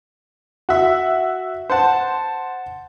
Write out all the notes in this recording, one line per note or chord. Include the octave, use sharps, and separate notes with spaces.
F#4 E5
C5 F#5 A5